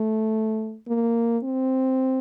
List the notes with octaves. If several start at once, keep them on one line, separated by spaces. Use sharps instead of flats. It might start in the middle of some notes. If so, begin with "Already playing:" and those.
Already playing: A3
A#3
C4